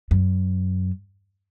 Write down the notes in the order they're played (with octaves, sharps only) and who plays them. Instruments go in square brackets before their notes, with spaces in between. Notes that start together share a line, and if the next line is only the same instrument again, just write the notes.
[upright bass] F#2